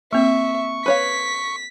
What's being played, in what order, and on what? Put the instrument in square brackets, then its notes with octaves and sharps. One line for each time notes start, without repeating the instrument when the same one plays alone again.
[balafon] A#3 C4 [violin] E5 [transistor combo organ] C#6
[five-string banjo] B4 C#5 F5 [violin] B6